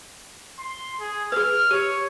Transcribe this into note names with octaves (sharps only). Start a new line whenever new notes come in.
C6
G#4
G#4 B4 F6
G4 C#5